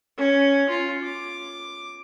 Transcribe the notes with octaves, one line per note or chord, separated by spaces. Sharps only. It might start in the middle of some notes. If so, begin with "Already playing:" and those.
C#4
F4
D6